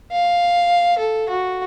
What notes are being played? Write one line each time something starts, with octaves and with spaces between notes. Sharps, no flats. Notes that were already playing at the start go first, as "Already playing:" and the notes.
F5
A4
F#4